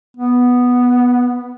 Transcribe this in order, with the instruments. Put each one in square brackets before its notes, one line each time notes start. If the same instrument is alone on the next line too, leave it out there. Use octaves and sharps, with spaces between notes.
[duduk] B3